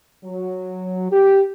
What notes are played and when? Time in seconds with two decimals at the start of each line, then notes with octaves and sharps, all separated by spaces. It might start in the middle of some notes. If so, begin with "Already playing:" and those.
0.24 F#3
1.11 G4